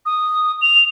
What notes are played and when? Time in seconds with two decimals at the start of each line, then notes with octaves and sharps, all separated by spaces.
0.06 D#6
0.62 F7